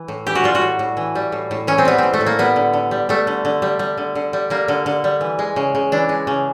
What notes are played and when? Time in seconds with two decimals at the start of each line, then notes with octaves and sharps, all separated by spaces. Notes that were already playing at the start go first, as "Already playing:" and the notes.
Already playing: E3
0.08 A2
0.27 E3 G4
0.35 F#4
0.44 G3 F4
0.55 F#4
0.62 A2
0.79 A2
0.97 E3
1.15 G3
1.32 A2
1.51 A2
1.67 E3 C#4
1.78 C4
1.85 G3 B3
1.98 A2 C4
2.13 A3
2.21 A2
2.26 A#3
2.39 G3 B3
2.56 D3
2.73 D3
2.91 G3
3.09 G3 A3
3.27 D3
3.45 D3
3.62 G3
3.79 G3
3.97 D3
4.15 D3
4.33 G3
4.50 G3 A#3
4.68 D3
4.86 D3
5.04 G3
5.21 E3
5.39 G#3
5.56 C#3
5.75 C#3
5.92 E3 D4
6.09 G#3
6.27 C#3